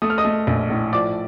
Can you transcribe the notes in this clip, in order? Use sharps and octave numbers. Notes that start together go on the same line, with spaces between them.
A3 D#6
F6
D#5 D#6
A3
A#1
A2
F3 D5 D6